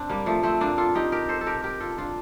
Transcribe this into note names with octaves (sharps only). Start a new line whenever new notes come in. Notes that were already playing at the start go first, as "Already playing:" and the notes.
Already playing: C4 D4
G3 A#3
F3 A3
A3 C4
A#3 D4
F4 A4
D#4 G4
G4 A#4
A4 C5
A4
G4 A#4
G4 A#4
F4 A4
D4 F4